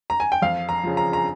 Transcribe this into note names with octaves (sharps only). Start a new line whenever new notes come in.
A#5
G#5
G5
F2 F5
A#5
C#3 F3
A#5
A#5